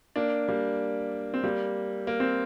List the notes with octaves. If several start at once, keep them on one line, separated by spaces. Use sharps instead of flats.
A#3 D4
G3 A#3
C4
G3 A#3
A#3
C4